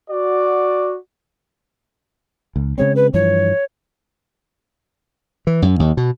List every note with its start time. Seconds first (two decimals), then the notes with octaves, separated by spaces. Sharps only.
0.10 F#4 D5
2.56 C#2
2.78 C#3 G#3 C4 C#5
2.96 B4
3.14 G2 E3 F3 C#5
5.47 E3
5.62 F#2
5.79 D#2
5.97 B2